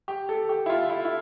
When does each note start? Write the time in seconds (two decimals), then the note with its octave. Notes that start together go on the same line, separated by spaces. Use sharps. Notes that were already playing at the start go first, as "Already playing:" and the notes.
0.08 G4
0.29 A4
0.49 G4
0.66 E4
0.70 F4
0.90 E4
1.05 E4